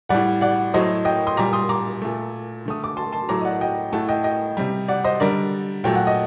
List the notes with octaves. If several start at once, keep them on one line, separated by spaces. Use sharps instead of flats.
A2 G3 D5 F#5
D5 F#5
A2 F#3 A3 C5 D#5
D#5 G5
C6 D#6
A#2 G3 A#5 D6
C6 D#6
A#5 D6
A#2 A3
D3 A3 D#6
D6
A5 C6
A5 C6
A2 F#3 A3 A#5 D6
D#5
D5 F#5
D#5 G5
A2 A3 F#5 A5
D#5 G5
D#5 G5
C3 G3
D5 F#5
C5 D#5
D3 G3 A#4 D5
A#2 F#3 A3 G5
F#5
D#5